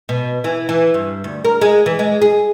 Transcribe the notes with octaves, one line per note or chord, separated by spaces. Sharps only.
B2
E3
E3
G2
D2
A#4
G#3
E3
G#3
G#4